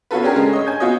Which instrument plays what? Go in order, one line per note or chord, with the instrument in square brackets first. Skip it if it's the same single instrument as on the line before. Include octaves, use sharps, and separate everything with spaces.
[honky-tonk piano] B3 C#4 F4 F#4 A4 B4
C#4 D4 G4 G#4 A#4
C#3 G#3 A3
C#5 D#5
G#5 G6 G#6
B3 F4 F#4 C#5 D#5